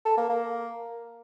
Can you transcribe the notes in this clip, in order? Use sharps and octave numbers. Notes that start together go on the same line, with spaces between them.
A4
A#3
A#3